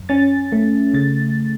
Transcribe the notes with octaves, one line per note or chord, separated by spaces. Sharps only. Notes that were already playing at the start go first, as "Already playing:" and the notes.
Already playing: F#2
C#4 A6
A3
C#3 A6